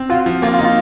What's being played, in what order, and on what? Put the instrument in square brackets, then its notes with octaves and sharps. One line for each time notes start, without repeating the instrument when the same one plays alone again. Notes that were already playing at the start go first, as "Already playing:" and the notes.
Already playing: [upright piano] C4
[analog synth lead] F4 [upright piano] F#4
[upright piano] F3
[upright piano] A#3 [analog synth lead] F4
[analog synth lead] F4
[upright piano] D#4
[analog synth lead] F4